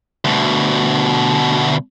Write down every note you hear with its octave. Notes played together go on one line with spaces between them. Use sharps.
D2 B2